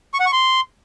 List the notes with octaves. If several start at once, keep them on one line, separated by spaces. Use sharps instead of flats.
C#6
F#5
C#6
C6